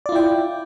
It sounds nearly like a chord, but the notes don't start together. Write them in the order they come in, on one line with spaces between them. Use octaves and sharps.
D5 F4 E4 G5